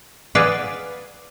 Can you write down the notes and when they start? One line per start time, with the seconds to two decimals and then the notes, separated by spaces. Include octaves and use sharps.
0.35 G#4 B4 D5 F5 F#5